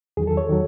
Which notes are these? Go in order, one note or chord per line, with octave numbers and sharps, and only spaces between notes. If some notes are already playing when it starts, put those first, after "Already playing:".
E2 D#3 F#3 G#4
A4
C#5
D#3 F#3